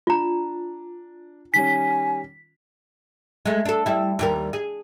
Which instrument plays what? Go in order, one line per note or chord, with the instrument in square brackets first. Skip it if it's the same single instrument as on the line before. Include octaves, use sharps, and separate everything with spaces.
[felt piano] D4 [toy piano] F4 A#5
[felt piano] D#3 G3 C#4 [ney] G#5 [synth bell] B6
[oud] G#3 A3
D4 A4
G3 E4
D#2 G3 A#4
G#4